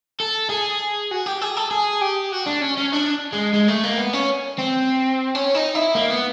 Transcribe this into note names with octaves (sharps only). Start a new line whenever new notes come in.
A4
G#4
F#4
G4
G#4
A4
G#4
G4
F#4
D4
C#4
C#4
D4
G#3
G#3
A3
A#3
B3
C#4
C4
C#4
D#4
E4
A#3
B3